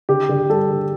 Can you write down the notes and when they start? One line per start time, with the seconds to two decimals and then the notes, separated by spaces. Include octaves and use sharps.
0.09 D3 G4
0.29 D3
0.49 G3 A4
0.70 D3